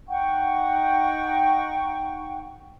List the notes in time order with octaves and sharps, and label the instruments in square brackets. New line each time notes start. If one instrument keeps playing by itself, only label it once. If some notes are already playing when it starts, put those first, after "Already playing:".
[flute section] D#4 F#5 G5 C#6